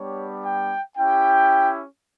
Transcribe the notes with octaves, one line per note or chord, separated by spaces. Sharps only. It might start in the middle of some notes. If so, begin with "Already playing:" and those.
Already playing: G3 B3 D4 G4 C#5
G5
C#4 E4 G4 G5